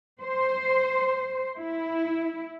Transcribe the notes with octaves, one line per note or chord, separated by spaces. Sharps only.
C5
E4